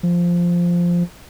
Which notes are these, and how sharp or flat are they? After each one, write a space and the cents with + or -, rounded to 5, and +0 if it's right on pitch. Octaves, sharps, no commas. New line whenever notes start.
F3 -5